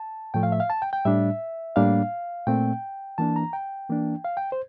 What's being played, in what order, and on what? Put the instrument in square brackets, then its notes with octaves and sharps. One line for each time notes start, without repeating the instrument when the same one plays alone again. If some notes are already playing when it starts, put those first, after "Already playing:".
Already playing: [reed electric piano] A5
A2 F3 A3 G5
F5
E5
F5
A5
G5
G5
A2 G3 D4 E5
A2 G3 A#3 D4 F5
A#2 A3 C4 G5
E3 A#3 D4 A5
A#5
G5
E3 A#3 D4
F5
G5
C5